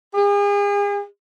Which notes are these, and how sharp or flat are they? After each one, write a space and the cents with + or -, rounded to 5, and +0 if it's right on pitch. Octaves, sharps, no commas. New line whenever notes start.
G#4 -40